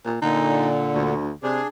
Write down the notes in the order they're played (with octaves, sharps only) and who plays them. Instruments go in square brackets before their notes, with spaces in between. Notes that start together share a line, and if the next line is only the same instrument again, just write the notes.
[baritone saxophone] A#2
[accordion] A#2 D3 [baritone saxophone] D#4
[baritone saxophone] D2
[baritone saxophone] C3 [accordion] D4 G#4